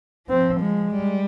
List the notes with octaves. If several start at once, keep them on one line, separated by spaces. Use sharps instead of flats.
F3 C4
G#3
G3